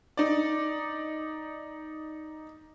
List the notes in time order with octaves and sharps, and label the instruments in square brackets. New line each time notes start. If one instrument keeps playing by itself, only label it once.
[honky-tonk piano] D#4 D5